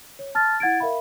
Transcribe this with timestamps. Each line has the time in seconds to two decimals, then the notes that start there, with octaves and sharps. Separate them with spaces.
0.19 C#5
0.35 A5 F6 A6
0.60 E4 F#5 G#6 A6 D7
0.80 A#4 E5 F5 B5